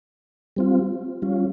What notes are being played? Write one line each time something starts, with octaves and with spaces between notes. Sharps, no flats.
G3 C4 F4
G3 C#4 F4